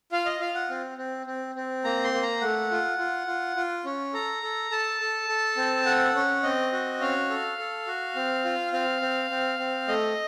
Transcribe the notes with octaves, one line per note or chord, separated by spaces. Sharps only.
F4 F5
D#5
F4 F5
F#5
C4
C4
C4
C4
A#3 A#5
C6
A#3
A#5
A3 F#5
F4
F4
F4
F4
C#4
A4 A#5
A4
A4 A5
A4
A4
C4
A4 F#5
C#4
C4 D#5
F#4
C#4 F5
A4
A4
F#4
C4
F4
C4 F5
C4
C4
C4
A3 D#5